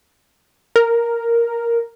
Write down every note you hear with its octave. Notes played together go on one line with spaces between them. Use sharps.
A#4